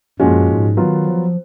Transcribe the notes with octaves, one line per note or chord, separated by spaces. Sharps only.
F#2 A#2 F3 G#3 C#4 F#4
G#2
D#3 F#3 B3 F4
F3